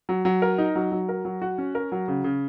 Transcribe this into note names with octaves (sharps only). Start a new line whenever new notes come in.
F#3
F#3
A#4
D#4
F#3
F#3
A#4
F#3
F#4
C#4
A#4
F#3
C#3
C#3